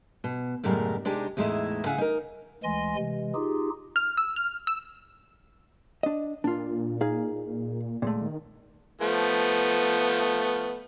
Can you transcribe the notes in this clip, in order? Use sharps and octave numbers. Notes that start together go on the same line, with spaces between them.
B2
F#2 A2 C#3 G3 G#3 A#4
C3 G#3 D4 D#4 G4
E2 A2 G#3 D#4 E4 E5
C#3 E4 F5 F#5 G#5
D#4 A#4
D2 E3 G#3 G#5 C6 A#6
C3 E3 G#3
D#4 F4 G4 G#4
F6
E6
F6
E6
D4 D#5
A#2 D4 F4
D#4 G#4 F5
D1 A#2 G#3 A3
D#3
F3 A3 B3